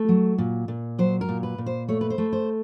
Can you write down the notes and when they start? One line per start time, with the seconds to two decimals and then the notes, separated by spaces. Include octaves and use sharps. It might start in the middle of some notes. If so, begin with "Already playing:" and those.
Already playing: A3
0.09 F#3
0.38 A#2
0.68 A#2
0.99 F#3 C5
1.21 A#4
1.29 A#2
1.43 B4
1.58 A#2
1.66 C5
1.88 A3 C#5
2.01 B4
2.10 C5
2.18 A3
2.33 C5